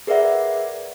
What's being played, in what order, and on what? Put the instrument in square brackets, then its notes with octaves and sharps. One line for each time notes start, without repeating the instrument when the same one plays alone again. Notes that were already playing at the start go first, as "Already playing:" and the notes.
[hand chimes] G#4 A#4 B4 D5 E5 F#5